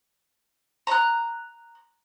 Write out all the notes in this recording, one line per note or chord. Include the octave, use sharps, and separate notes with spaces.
A#5 F#6